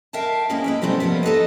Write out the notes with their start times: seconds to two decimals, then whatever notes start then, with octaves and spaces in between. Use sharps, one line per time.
0.13 A#4 E5 F5 G5 A5
0.49 G#2 G#3 A#3 C#4 E4 A#4
0.64 E4 B4 G5
0.82 C3 G3 A3 B3 C4
1.00 F3 G3 A#3 B3
1.23 D#4 A4 B4 D#5